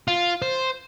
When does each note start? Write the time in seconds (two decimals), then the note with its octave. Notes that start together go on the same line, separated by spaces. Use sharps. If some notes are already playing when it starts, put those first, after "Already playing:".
0.08 F4
0.42 C5